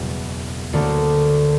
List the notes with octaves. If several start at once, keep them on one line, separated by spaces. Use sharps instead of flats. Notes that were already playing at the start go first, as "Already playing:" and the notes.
Already playing: F#1 E2 B2 G3 F#5
D2 D3 A#3 D4